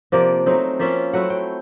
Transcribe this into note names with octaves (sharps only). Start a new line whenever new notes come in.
C3 F3 A#3 D5
F#3 A3 C4 D#4
F3 A#3 C#4 F4 E5
F#3 A3 C4 E4 F#5
G5